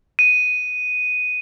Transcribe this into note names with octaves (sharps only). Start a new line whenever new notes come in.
D#7